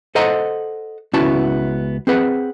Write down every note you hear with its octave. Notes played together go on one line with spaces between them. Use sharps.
A4 C5 D#5 F#5 A#5
C#2 B3 C#4 E4 F#4 A5
C4 G#4 B4 F#5